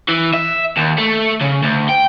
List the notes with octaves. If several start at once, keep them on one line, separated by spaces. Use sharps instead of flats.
E3
E5
D#2
A3
C#3
D2
G5